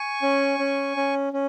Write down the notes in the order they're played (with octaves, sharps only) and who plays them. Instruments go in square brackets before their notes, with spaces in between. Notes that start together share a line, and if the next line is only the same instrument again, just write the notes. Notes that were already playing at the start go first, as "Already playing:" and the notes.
Already playing: [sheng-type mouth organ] G#5 C#6
C#4
C#4
C#4
C#4